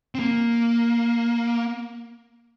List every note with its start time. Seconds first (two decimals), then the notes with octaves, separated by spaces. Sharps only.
0.15 C4
0.19 A#3